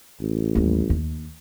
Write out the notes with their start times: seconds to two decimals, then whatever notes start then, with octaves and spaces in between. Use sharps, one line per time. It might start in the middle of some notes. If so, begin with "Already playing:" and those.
0.21 A1
0.55 D#2 G3
0.90 D#2